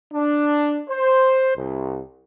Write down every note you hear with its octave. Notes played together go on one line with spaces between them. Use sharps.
D4
C5
C2